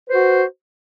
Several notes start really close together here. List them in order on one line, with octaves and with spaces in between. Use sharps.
B4 C5 F#4